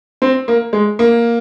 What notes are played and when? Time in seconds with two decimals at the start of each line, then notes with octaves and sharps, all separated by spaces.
0.22 C4
0.48 A#3
0.73 G#3
0.99 A#3